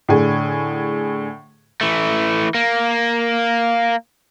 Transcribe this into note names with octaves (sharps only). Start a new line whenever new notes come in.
A2 D3 G#4
E3 A3
A#3